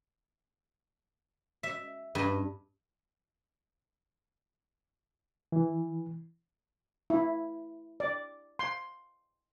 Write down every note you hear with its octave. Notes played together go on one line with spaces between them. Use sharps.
E5
G2
E3
E4
D5
C6